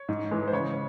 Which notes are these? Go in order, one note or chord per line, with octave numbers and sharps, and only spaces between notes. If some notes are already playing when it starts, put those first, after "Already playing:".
Already playing: C#5
G#2
E3 G#3
C5
C#3 C#5